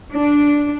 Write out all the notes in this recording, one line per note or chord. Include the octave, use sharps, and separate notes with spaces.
D4